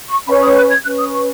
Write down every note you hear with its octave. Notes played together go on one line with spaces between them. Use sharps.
C#6
C#4 B4 B5
D#6
F#6
G#6
C#4 B4 F#6
D#6
C#6